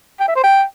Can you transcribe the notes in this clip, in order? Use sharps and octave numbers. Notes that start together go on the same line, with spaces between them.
G5
E5
C5
G5